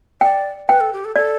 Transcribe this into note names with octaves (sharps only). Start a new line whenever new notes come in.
D5 G5
B4 G5
A4
G4
A4
A4 D5